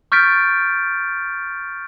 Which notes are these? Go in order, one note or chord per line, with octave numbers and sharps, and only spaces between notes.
C#6 F6 G6 A6 B6 D7